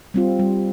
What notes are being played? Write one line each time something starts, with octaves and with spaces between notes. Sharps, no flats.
G3 C4 F4
G3